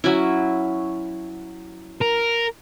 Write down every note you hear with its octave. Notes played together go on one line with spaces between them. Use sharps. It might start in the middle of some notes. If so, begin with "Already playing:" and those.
F#3 C#4 E4
A#4